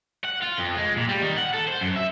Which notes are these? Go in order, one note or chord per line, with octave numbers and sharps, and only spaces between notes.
F#5
F4
F2
G#3
A#2
G3
D#3
F#5
A4
C5
F#2
E5